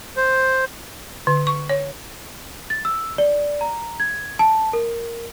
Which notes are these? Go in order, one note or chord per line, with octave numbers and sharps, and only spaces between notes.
C5
D3
C#6
C#5
A6
E6
D5
A#5
G#6
A5
A#4